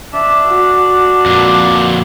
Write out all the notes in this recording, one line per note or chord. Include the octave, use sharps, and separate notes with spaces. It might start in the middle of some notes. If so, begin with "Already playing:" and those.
D4 E5
F#4
F2 A#2